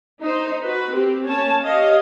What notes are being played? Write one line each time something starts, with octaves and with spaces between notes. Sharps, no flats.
D#4 C5
F#4 B4
C4 G4
A#3 C#4 C#5 A5
G4 C#5 D#5 F5